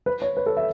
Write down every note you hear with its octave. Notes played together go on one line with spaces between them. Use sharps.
B4
C#5
B4
A4
E5